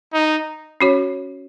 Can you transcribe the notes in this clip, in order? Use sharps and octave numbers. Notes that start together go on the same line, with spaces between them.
D#4
C#4 F#4 C#5